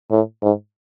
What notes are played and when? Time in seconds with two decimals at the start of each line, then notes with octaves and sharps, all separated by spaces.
0.11 A2
0.42 G#2